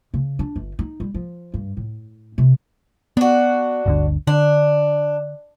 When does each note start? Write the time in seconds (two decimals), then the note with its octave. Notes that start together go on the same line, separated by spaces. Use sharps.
0.14 C#3
0.39 D4
0.56 G1
0.79 D#4
1.00 G3
1.14 F3
1.54 G2
1.77 A2
2.38 C3
3.17 B3 D4 F#4
3.86 G1 D2 D3
4.27 D3 D4